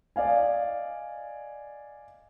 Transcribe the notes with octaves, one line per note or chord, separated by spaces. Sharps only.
D5 D#5 F5 G#5